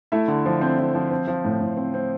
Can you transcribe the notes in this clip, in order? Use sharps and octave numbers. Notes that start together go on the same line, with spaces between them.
A3 E4 E5
D3
F3
C4 C5
F3
F3
C4
F3
A2
A2
C4
C4